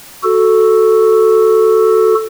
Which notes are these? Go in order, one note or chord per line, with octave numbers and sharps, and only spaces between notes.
F#4 A4